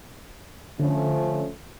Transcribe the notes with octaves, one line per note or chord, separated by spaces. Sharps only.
D3 F3 A3 C#4